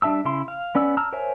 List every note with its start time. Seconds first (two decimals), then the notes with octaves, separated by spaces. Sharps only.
0.02 G3 D4 E5 A5 E6
0.25 C#3 E4 C6
0.48 F5
0.75 B3 C#4 D5 E6
0.97 A5 A#5 E6 F6
1.13 A#4 C5 C#5 E5 G#5